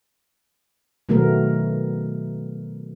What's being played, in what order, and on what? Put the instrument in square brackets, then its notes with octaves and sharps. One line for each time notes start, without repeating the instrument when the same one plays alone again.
[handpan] B2 D#3 F#3 A3 B3 A#4